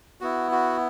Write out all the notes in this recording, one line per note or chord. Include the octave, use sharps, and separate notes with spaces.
B3 E4 F#4
F#4